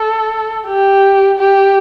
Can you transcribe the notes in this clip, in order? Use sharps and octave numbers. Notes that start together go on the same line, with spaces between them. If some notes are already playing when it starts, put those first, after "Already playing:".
Already playing: A4
G4
G4